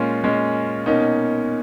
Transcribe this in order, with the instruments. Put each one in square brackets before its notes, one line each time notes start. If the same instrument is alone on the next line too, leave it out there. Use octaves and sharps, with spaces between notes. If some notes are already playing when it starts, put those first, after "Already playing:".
Already playing: [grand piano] A#2 G#3 C#4 F4
A#2 G#3 C#4
B2 A#3 C#4 D#4